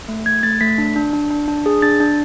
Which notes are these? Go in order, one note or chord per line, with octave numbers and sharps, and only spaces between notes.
A3
A3 G#6
A3 A6
A3 B6
D4
D4
D4
D4
D4
G#4
D4 A6
D4